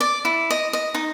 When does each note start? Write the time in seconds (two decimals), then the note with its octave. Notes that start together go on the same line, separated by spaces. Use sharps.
0.01 D5
0.25 E4
0.51 D#5
0.73 D#5
0.94 D#4